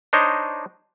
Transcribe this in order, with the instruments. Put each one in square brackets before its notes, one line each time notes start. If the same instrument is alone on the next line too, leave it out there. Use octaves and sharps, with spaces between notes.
[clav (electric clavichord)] D4 D#4 C5 C#5 D#5